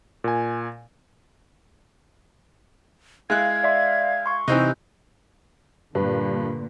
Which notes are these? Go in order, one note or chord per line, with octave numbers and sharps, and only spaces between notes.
A#2 G#5
G#3 E4 F5 F#6 G#6
D5 E5 C6
C6 C#6
C3 E3 C4 D#4 F#6 G6
G2 A#2 D3 B4